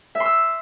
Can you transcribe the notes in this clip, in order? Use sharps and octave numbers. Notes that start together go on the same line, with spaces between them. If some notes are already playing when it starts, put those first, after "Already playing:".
E5
C6
E6